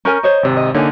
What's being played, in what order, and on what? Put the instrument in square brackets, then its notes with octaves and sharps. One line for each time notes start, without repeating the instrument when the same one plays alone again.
[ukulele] C#4 A#4 G#5 [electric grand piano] A#5 C#6 G6
[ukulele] C5 C#5 D#5
[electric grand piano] G#1 C3
[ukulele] D#5
[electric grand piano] D3 A#3 D#4 [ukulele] C#5 G#5